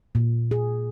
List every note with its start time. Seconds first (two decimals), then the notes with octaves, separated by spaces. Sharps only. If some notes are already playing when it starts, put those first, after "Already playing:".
0.15 A#2
0.51 G#4